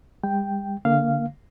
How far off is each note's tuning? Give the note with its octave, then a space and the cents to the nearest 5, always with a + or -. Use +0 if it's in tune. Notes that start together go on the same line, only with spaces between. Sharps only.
G3 +40 G5 +0
D3 -20 A#3 +0 F5 -10